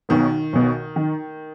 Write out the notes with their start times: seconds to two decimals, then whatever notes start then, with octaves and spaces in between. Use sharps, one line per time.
0.09 B1 B2 D#3 B3
0.53 B1 B2 B3
0.96 D#3